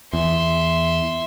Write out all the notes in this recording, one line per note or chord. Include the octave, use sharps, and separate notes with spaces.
E2 E5 C6